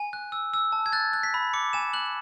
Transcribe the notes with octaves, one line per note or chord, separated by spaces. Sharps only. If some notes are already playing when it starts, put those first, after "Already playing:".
Already playing: G#5
F#6
E6
E6
A5
G#6
F#6 A6
F#6
B6
B5
D6 C#7
G#5 E7
F#6 F#7